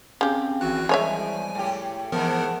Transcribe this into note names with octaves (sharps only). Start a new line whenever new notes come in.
C#3 C4 G4
G#1 E2 F#4 F#6
F3 G3 G#3 C#5 E5 G#5
A2 G4
G#2 E3 F3 B3 A#4 F#5 A5